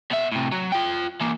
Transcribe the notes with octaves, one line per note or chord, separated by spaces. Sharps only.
B2 E5
A2 C3
F#3
F4 G5
E3 A#3